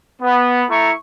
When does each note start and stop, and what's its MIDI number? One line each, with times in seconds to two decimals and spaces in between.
0.22 0.63 59
0.70 0.92 57
0.70 0.92 64
0.70 0.92 82
0.70 0.92 85